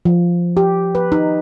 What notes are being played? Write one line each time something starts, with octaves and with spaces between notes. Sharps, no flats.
F3
G4
B4
D#4